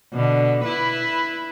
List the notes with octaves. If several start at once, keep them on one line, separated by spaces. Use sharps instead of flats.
B2 D3
E4 B4